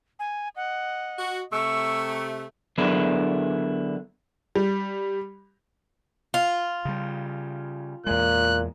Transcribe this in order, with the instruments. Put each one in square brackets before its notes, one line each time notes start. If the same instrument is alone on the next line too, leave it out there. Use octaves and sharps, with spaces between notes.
[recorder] G#5
[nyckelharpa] D#5 [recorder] F#5
[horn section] F#4
[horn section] C3 A3 [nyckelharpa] C#6 [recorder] E6
[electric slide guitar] D3 F#3 B3 E4 G#4 A#4
[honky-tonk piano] G3
[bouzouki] F4
[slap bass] C#3 G3
[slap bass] E2 G#3 [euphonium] A#2 [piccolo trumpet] F#6